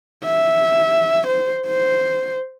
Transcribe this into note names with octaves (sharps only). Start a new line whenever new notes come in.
E5
C5
C5